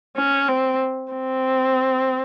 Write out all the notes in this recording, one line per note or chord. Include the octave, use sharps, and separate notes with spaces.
C#4
C4
C4